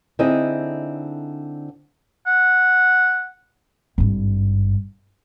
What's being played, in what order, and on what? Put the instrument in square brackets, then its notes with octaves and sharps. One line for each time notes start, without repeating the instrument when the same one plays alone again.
[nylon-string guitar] D3 C4 D#4 E4 G#4 D#5
[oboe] F#5
[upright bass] G#1 G2